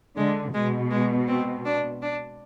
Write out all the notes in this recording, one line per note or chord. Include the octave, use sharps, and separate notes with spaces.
D3 G#3
B2 G#3
G#3
C4
D4
D4